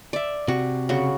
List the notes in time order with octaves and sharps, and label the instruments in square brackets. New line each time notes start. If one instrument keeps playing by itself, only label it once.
[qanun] D5 E5
[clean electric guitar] C3 [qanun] F#4
[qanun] C#3 F#4